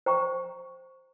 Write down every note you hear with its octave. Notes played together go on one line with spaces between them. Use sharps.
C5 G5 A#5 C#6